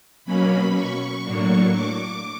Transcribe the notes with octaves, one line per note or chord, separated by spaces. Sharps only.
B2 F#3 A#3 C#4 B5
C#6
A2 F#3 A#3 D4
D6